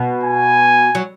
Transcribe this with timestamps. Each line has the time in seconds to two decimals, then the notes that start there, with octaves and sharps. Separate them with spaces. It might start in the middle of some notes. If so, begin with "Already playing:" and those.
Already playing: B2
0.23 G#5
0.95 F#3